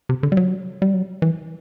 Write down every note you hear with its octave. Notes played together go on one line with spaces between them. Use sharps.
C3
D3
G3
F#3
G3
F#3
E3